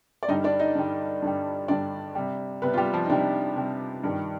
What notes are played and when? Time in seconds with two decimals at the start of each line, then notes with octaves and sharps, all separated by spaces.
0.23 D5
0.28 G2 D3 G3 D#4 D#5
0.44 D4 D5
0.59 D#4 D#5
0.75 G2 D3 G3
1.22 G2 D3 G3
1.68 G2 D3 G3 D4 D5
2.15 C3 G3
2.62 C3 G3 B3 B4
2.73 F4
2.78 G3 G4
2.94 F3 F4
3.05 D#4
3.09 C3 G3 D4
3.55 C3 G3
4.03 G2 D#3 G3